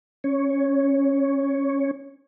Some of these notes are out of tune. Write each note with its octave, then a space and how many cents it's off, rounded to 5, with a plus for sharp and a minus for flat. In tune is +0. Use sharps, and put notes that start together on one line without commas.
C#4 -10 C#5 +5